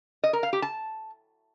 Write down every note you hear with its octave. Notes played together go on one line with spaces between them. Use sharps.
D#5
A#4
F5
G4
A5